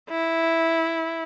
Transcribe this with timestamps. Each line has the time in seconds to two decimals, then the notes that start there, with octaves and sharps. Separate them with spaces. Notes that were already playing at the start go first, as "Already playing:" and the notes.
0.10 E4